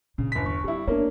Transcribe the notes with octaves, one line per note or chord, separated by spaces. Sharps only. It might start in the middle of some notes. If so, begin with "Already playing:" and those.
A#2 C#3
G1 B6
E2 C#6
G3 C4 E4
A#3 B3 D4 A#4 C#5